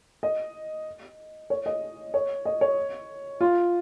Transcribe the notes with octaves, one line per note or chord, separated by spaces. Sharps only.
D#5
C#5
D#5
C#5
D#5
C#5
F4